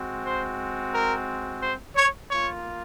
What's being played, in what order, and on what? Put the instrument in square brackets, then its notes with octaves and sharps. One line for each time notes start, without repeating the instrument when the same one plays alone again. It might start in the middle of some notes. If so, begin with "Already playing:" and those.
Already playing: [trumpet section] G#3 C4 F#4
C5
A#4
C5
C#5
A#3 F4 C#5